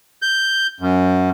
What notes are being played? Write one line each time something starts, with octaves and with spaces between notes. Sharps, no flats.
G6
F#2